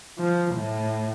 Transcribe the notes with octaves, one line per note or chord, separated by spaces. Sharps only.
F3
A2